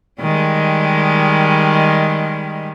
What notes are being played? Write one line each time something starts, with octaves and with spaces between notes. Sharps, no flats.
D#3 G3 G#3